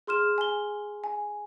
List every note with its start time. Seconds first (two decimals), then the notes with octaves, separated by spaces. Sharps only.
0.07 G#4 C6 F6 E7
0.38 G#5 G7
1.04 G#5